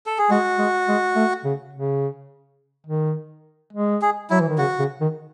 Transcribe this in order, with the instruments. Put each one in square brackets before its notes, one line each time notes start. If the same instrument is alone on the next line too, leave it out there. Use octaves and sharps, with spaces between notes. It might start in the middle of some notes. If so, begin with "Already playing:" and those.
[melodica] A4
G#4
[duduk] G#3 [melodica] F#4
[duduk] G#3
G#3
A3
C#3
C#3
D#3
G#3
[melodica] G#4
[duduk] F#3 [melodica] E4
[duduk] E3
D#3
[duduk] C#3 [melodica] F#4
[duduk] C#3
D#3